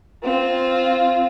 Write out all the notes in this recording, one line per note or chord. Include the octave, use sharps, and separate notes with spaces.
C4 F4